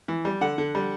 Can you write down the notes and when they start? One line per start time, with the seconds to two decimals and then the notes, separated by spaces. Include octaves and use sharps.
0.08 E3
0.25 G3
0.41 D3 F#5
0.58 D3
0.75 G3